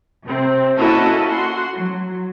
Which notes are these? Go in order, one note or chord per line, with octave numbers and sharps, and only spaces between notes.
C3 C4
A#3 C#4 E4 F#4 A4 D#5
F#4 C6
F#3